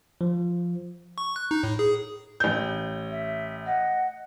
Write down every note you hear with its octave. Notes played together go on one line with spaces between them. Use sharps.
F3
C#6
F#6
D#4
A2
G#4
A1 G6
E5
D#5 F#5